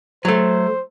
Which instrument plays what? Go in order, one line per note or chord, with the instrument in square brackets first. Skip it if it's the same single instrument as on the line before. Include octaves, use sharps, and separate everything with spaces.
[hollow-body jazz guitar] F#3 A3 [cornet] C5